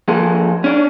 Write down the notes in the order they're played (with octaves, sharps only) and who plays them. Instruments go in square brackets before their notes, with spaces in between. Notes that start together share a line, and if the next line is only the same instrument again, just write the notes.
[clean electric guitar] F3 A#3 G#4 A4
C#4 D4